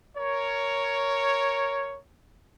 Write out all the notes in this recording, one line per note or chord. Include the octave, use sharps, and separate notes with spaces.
A#4 C#5